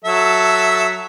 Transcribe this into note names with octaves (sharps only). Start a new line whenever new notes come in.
F#3 A4 E5